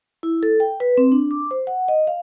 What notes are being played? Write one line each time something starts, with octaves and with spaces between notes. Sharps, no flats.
E4
A4
G5
B4
C4
D4
D6
C5
F#5
D#5
F5